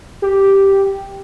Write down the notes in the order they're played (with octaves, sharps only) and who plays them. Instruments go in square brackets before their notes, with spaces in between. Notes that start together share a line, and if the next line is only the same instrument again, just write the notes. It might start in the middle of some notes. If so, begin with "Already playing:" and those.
[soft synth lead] G4